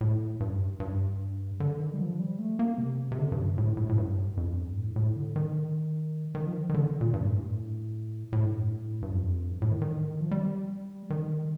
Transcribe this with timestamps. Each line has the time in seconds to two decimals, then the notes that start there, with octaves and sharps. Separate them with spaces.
0.01 A2
0.40 G2
0.80 G2
1.60 D3
1.79 D#3
1.93 G3
1.99 F3
2.19 G3
2.39 A3
2.59 A#3
2.78 C3
3.12 C3
3.19 D3
3.32 G2
3.58 A2
3.77 A2
3.89 A2
3.98 G2
4.37 F2
4.57 G2
4.77 A2
4.96 A2
5.16 D3
5.36 D#3
6.35 D#3
6.46 F3
6.54 D#3
6.69 D#3
6.74 D3
7.01 A#2
7.14 G2
7.24 A2
7.34 G2
7.44 A2
8.33 A2
8.45 G2
8.57 A2
9.02 G2
9.13 F2
9.51 G2
9.62 A2
9.71 D#3
9.82 D#3
10.20 F3
10.31 G3
11.10 D#3